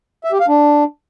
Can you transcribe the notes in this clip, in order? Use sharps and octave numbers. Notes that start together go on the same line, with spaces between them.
E5
G4
F5
D4